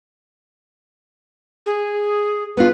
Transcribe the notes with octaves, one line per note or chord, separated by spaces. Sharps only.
G#4
B3 D4 F4 B4